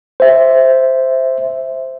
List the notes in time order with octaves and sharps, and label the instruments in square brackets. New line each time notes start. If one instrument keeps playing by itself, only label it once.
[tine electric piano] C5 E5